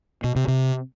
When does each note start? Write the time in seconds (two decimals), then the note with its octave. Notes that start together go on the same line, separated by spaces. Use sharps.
0.24 B2
0.36 C3
0.48 C3